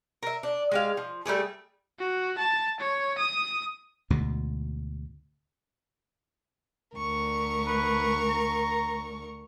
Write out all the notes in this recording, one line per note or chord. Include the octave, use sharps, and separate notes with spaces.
A#4 E5
D4
G#3 G4 F5
F3
G3 A3 G4 G#4
F#4
A5
C#5
D#6
D2 G#2 B2
D2 A#4 C#6
B4
A#5